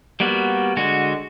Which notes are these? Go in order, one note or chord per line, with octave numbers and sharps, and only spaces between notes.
G3 A#3 B3 F#4
D3 G#3 F#4